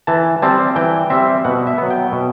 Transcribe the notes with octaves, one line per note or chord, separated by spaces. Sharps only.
E3 A5
G3 C4 A5
E3 G5
G3 C4 E5
B2 F#5
E5
F#3 B3
G5
B2